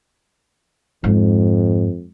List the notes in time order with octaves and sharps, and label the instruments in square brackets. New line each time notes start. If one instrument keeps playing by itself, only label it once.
[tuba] F2 [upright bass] G#2